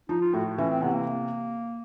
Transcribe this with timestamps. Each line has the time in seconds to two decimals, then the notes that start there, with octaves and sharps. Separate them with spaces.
0.09 F3 D#4
0.21 F4
0.34 A2 F#4
0.58 E3 C#4
0.70 C4
0.82 C3 B3
0.94 A#3